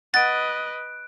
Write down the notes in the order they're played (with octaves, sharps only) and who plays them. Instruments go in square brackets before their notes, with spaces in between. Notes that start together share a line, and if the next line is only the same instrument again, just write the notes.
[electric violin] B4 D#5 [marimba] F#5 [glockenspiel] F#6 D7 [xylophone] A6